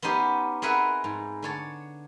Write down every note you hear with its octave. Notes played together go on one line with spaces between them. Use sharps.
B3 C#4 D#4 G4 C5
C4 G#4 A#4 B4 E5 F#5
G#2
D3 C#5 A5